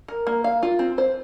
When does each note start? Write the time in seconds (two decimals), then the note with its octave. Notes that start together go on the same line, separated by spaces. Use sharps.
0.08 A#4
0.27 A#3
0.44 F5
0.63 F4
0.79 C4
0.98 C5